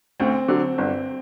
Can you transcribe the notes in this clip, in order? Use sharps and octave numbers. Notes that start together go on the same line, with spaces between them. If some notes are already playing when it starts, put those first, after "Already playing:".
D2 C4
D3 F#3
G1